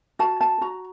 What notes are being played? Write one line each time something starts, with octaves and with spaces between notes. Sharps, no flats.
F#4 A5
A5
F#4 A#5